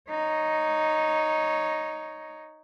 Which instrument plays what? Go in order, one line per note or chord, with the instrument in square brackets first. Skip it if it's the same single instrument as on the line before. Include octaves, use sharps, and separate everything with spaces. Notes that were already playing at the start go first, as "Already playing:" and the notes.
[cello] D#4 C#5